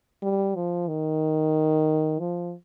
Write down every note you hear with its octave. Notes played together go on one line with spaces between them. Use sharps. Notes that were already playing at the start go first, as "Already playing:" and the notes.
G3
F3
D#3
F3